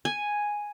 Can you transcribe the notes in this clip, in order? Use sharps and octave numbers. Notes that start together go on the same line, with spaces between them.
G#5